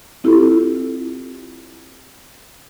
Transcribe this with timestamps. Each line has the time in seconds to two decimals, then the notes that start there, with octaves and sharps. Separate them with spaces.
0.24 C4 E4 F4 G4 A4